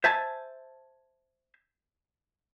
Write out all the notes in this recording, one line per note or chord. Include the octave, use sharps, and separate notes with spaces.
C5 E5 G#5 A5